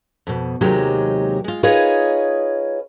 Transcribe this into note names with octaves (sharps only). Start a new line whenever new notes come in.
F2 B2
D#2 C3 F#3 G#3 D#4 G4
G#3 F4
D#4 F4 G#4 B4 C#5 D#5